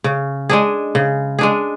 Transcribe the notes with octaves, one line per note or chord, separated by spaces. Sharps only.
C#3
G#3 D4 G#4
C#3
G#3 D4 G#4